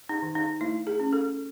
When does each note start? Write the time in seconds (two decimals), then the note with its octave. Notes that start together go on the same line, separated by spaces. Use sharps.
0.09 D#4
0.22 D#3
0.35 D#4
0.61 A3 E4
0.87 G#4
1.00 C#4
1.13 A4